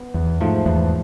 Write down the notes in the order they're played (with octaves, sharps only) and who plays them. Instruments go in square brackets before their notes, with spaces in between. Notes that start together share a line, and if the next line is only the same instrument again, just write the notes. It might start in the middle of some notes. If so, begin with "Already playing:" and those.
Already playing: [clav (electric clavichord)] B3
[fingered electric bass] E2
[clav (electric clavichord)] G#2 F3 A3
[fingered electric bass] E2